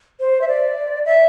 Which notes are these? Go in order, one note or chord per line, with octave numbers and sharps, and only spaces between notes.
C5
E5
D5
E5